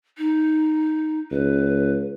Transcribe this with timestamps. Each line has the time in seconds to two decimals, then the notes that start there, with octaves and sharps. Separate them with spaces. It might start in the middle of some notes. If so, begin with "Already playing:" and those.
0.18 D#4
1.31 C#2 B4